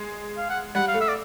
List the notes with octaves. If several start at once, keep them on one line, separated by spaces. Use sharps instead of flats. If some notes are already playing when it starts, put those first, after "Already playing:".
Already playing: G#3
F5
F#5
G3 F#5
F5
A3
E5
D5